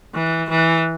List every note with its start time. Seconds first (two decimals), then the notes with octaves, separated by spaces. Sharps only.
0.15 E3
0.50 E3